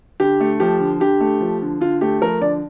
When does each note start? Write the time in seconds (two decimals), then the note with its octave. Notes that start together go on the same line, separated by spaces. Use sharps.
0.20 D3 G4
0.40 A3
0.60 F3 G4
0.80 D3
1.00 D3 G4
1.21 A3
1.40 F3
1.62 D3
1.81 D3 F4
2.01 A3 G4
2.21 F3 A#4
2.41 D3 D5